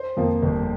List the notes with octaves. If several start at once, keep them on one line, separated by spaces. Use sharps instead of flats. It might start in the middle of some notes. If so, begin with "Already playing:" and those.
Already playing: C5
F2 F3 A#3
G1